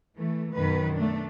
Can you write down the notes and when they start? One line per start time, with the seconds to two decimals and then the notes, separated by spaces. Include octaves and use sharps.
0.17 E3 A3
0.54 F#2 B2 D#3 B4
0.94 A3 D4